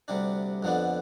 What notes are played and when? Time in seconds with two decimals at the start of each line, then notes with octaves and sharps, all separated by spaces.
0.08 D2 C3 G3 D4
0.63 F2 D3 F3 B3 D4